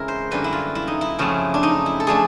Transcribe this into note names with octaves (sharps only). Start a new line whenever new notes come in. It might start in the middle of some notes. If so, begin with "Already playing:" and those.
Already playing: C#3 E3 G#3 C4 E4 A#4
C5
F#2 D3 G3 A#3 B4
E4
F4
E4
D#4
E4
F#2 C#3 F3 A3 C4
D4
D#4
E4
A4
F3 A3 D4 G#4